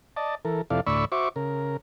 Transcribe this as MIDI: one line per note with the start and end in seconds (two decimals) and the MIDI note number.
0.17 0.35 74
0.17 0.35 75
0.17 0.35 81
0.45 0.61 52
0.45 0.61 69
0.45 0.61 70
0.70 0.80 41
0.70 0.80 48
0.70 0.80 64
0.70 0.80 69
0.70 0.80 74
0.70 0.80 77
0.87 1.05 38
0.87 1.05 45
0.87 1.05 74
0.87 1.05 83
0.87 1.05 85
0.87 1.05 88
1.12 1.29 66
1.12 1.29 72
1.12 1.29 76
1.12 1.29 85
1.12 1.29 86
1.36 1.77 49
1.36 1.77 70